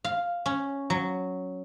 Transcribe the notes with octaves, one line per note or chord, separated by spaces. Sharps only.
F5
C#4
F#3